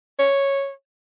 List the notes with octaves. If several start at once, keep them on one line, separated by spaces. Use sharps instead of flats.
C#5